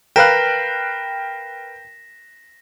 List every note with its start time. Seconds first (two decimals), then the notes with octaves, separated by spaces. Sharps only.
0.16 A#4 B4 F5 G5 F#6 A#6 B6 E7